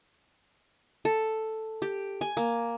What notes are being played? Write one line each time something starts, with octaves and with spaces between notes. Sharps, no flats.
A4
G4
G#5
A#3